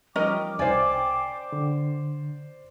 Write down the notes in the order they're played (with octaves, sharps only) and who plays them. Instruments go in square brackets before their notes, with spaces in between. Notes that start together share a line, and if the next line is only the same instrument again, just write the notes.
[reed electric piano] F3 G3 D#4 [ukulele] C#4 A#4 D#5 [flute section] G5 D6
[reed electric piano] C2 G#5 A6 [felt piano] C5 D5
[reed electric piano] D3